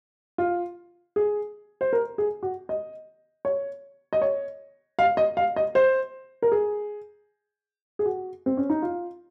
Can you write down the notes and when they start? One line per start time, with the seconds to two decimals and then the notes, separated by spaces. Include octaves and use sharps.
0.38 F4
1.16 G#4
1.81 C5
1.93 A#4
2.18 G#4
2.43 F#4
2.69 D#5
3.45 C#5
4.13 D#5
4.22 C#5
4.99 F5
5.17 D#5
5.37 F5
5.56 D#5
5.75 C5
6.42 A#4
6.52 G#4
7.99 G#4
8.06 F#4
8.46 C4
8.57 C#4
8.70 D#4
8.82 F4